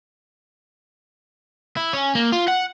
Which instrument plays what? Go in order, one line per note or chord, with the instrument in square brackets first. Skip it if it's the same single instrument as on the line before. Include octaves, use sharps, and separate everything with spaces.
[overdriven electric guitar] E4
C#4
A#3
F4
F#5